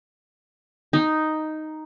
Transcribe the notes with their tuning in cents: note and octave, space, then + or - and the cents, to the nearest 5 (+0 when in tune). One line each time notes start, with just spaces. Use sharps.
D#4 +0